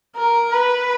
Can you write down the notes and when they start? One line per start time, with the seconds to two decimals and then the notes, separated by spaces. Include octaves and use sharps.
0.16 A#4
0.53 B4